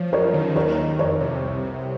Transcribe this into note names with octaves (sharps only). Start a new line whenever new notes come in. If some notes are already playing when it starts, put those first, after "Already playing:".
Already playing: F3 C#5
F#2 A#4 C#5
D#3
D#2 A#4 C#5
D#3
F2 A#4 C#5
C3
C2
C3